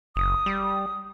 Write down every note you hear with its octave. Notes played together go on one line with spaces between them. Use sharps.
F#1 D#6
G3